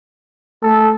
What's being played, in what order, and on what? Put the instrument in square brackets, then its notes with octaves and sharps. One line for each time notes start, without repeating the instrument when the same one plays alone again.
[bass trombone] A3 [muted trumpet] A4